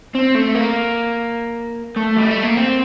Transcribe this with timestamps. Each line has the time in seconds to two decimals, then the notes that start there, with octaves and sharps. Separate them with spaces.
0.15 C4
0.35 A3
0.55 A#3
1.97 A3
2.17 G3
2.31 A3
2.43 A#3
2.57 C4